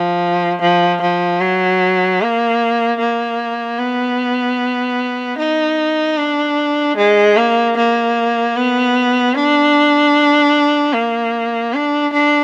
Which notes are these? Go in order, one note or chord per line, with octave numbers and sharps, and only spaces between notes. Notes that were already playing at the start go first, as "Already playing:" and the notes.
Already playing: F3
F3
F3
F#3
A#3
A#3
B3
D#4
D4
G#3
A#3
A#3
B3
D4
A#3
D4
D4